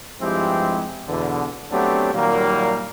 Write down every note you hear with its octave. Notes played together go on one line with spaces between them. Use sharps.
G2 F3 G#3 C4 E4 G4
E2 B2 D3
F#3 A3 B3 C4 D4 G4
A#2 D#3 F#3 G3 A#3